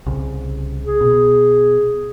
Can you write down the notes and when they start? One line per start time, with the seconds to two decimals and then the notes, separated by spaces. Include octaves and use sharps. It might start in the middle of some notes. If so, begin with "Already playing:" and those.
0.06 C2 C#3
0.86 G#4
1.01 B2